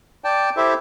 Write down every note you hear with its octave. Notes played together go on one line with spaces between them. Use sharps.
D5 G5 A5
E4 G4 A4 C5 E5